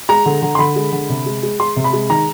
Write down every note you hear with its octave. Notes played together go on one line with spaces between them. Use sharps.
G#3 A#5
D3
D3
C6
D3 B5
G#3
D3
C3
G#3
G#3
G#3 C6
C3
B5
G#3
D#3 A#5